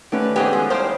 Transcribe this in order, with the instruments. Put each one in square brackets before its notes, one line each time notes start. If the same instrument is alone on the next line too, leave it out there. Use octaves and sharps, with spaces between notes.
[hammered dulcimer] D3 [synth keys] D#3 A3 C#4 [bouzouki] G4 B4
[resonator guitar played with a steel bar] F2 G4 [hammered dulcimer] G#3 D#4 E4 [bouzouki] B3 G#4 C5
[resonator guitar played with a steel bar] F3
[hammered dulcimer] A2 G3 [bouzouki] A#4 G5 A5 [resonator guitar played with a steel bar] C5 [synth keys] F5